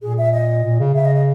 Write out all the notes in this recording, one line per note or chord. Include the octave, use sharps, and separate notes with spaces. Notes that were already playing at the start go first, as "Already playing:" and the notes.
A#2 G#4
E5
D#5
A#2
C#3
C#3 E5
D#5
D#5